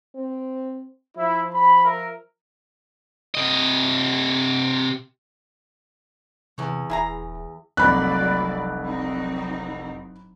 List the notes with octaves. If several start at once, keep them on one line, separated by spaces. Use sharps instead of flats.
C4
F3 E4 E5
B5
A#4 E5
C3 D#5
E2 C3 C#5
D#1 E4 G#4 A#5
F1 C2 F#3 A#3 D5 B5 F#6
F#3 C4 D#4